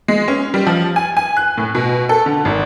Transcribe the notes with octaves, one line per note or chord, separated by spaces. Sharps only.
G#3
C#4
G3
F3
G#5
G#5
F#6
A2
B2
A4
D3
G#1